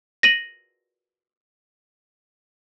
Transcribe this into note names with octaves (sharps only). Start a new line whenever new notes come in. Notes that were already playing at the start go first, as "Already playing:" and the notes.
A#6 D#7 F#7